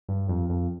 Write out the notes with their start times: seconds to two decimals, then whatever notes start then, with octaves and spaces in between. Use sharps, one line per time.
0.09 G2
0.28 F2
0.49 F2